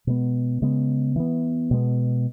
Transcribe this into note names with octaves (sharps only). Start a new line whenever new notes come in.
B2 G#3 B3
C#3 G#3 B3
E3 B3
B2 G#3 B3